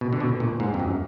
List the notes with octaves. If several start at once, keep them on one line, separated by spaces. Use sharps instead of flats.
B2
D3
B2
A#2
G#2
F2
F#2